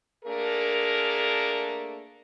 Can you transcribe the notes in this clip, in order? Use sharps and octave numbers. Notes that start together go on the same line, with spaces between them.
A3 A#3 D4 G#4 A#4